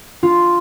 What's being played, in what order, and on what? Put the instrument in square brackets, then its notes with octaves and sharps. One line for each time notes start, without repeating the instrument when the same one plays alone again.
[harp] F4